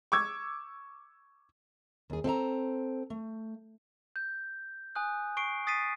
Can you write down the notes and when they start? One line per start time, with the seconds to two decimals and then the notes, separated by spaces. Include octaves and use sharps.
0.12 C#6 D6 E6 G#6
2.10 D#2 G#4
2.24 C4 A4 E5 A#5
3.10 A3
4.16 G6
4.95 G#5 D#6 F#6
5.37 C#6 C7 D7
5.67 D#6 A6 B6 C7 D#7